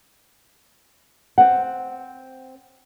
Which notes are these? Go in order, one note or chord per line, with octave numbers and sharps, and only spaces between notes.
C4 C5 F#5